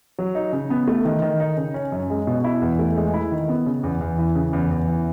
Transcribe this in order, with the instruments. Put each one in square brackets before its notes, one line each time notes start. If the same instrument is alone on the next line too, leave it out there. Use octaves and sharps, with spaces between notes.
[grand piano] F#3
D#4
C#3
B3
A3
D#3
D#3
D#4
C#3
C#4
F#2
G#3
B2
E4
E2
A3
G#3
E4
D#3
B3
C#3
E2
E2
E3
C#3
E2
E2
E3